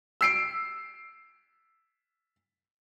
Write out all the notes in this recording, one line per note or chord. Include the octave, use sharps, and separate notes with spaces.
E6 C7 D7